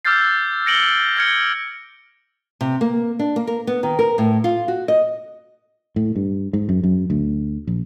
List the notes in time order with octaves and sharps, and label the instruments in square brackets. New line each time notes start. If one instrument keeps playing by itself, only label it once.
[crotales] D6 E6 F6 G6 A6 C7
A#6 C#7 D7 F#7 G7
F6 G#6 C#7 G7
[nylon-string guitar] C3
A#3
D4
A#3
A#4
B3
D#3
A#4
A2
F4
F#4
D#5
[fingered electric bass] A2
G2
G#2
F#2
F#2
D2
A#1